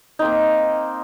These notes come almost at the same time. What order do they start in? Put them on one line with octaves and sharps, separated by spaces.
D#4 C4 A#3